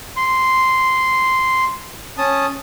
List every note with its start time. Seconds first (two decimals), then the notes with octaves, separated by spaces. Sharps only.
0.17 C6
2.18 C#4 A5 D#6